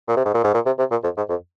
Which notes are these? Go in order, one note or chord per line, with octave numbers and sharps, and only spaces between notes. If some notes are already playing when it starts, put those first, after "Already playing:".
A#2
C3
G#2
A#2
G#2
A#2
C3
C3
A#2
F2
G#2
F2